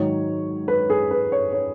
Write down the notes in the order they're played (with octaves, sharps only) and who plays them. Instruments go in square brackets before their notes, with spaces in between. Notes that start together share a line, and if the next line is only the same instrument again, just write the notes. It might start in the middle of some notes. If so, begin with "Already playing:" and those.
Already playing: [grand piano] G#2 D#3 F#3 C#5
B4
G#4
B4
C#5
C#5